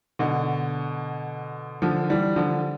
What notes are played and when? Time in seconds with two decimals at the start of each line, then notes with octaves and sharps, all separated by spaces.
0.19 B2 D3
1.82 D3 F3
2.10 E3 G3
2.36 D3 F3